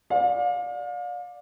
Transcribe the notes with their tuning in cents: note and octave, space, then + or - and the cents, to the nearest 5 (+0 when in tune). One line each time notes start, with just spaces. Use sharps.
D5 +0 F5 +35